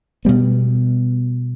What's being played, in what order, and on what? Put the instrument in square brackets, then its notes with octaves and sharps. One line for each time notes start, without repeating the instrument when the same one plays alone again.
[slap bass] B2 G3 B3